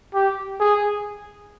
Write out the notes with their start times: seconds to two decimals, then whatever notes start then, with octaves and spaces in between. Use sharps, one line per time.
0.14 G4
0.60 G#4